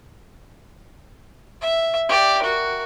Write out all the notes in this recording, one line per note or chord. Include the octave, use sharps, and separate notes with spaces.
E5
G4 D5
F#4 A#4